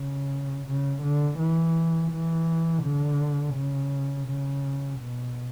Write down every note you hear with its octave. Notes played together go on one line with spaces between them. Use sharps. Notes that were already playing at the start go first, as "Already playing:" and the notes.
Already playing: C#3
C#3
D3
E3
E3
D3
C#3
C#3
B2